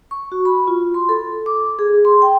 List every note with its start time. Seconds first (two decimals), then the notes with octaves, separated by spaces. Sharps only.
0.11 C#6
0.32 F#4
0.45 B5
0.68 F4
0.94 C6
1.09 A4
1.46 D6
1.79 G#4
2.05 C6
2.22 G5